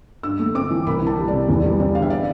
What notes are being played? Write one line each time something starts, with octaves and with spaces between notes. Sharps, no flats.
G2 E6
A3
C4 D6
E3
C2 B5
E3 A5
G3
D5
C3
E2
G3
C4 D5
D3 F5
E5
D5